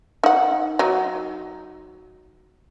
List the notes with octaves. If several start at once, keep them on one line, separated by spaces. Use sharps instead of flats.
D#4 F#5
F#3 D#4